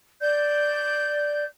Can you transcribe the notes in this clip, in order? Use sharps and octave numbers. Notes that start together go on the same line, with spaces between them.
D5 G6